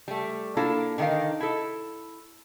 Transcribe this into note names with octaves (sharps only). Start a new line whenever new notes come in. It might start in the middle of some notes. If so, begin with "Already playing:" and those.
G3 A3
A#3 D4 E4 F4 A4
D3 D#3 D#4 A#4 F5
E4 A4